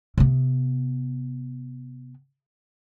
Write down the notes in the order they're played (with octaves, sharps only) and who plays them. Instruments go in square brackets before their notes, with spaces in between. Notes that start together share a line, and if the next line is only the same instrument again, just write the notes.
[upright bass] C3 B3